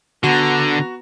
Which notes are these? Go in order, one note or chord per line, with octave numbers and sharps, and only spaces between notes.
D3 B3 F#4 A#5